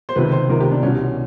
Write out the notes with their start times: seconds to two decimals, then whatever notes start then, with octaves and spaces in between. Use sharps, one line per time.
0.09 C5
0.16 C#2 C3 D#3 B4
0.32 C5
0.49 C#2 C3 D#3 A#4
0.60 G4
0.71 D4
0.83 C2 B2 C#4